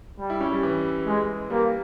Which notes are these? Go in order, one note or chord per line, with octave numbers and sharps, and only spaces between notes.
G3
E4
C#4
G3
E3
G#3
G3 A#3